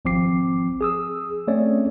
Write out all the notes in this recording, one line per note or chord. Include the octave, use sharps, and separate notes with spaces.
G#1 F3 C4 D6 C7
G#4 D#6 E6
A3 C4 C#4 C#5 D5